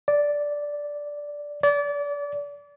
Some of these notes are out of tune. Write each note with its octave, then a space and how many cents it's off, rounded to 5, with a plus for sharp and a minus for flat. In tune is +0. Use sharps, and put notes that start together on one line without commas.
D5 -5
D5 -30